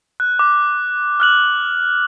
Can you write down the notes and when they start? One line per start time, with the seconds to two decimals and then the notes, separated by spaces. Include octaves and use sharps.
0.20 F#6
0.39 D6
1.20 F6 F#6 F#7